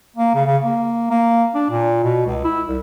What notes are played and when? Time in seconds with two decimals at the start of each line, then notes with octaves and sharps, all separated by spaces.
0.16 A#3
0.35 C#3
0.47 C#3
0.63 A#3
1.11 A#3
1.55 D4
1.71 A#2
2.04 B2
2.27 C#2
2.44 E4
2.68 C2